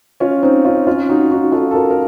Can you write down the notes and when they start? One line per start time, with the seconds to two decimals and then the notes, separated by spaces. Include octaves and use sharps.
0.20 C#4 F4
0.43 C4 D#4
0.65 C#4 F4
0.87 C#4 F4
1.09 D#4 F#4
1.31 D#4 F#4
1.52 F4 A4
1.71 A4
1.74 F#4 A#4
1.90 A#4